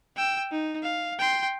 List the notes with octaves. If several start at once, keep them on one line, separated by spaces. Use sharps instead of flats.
G5 E6
D#4
F5
G5 C6